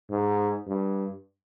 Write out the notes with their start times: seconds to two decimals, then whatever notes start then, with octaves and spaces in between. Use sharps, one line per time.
0.10 G#2
0.67 G2